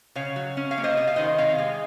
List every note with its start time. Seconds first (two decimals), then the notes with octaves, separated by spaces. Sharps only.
0.15 C#3 C#5 F5
0.36 F#3
0.57 C#4
0.71 C#5 F5
0.78 A#3
0.83 C5 D#5
0.97 C3 D#5
1.07 F5
1.16 D#3 C5 D#5
1.38 C3 C#5 F5
1.58 G#3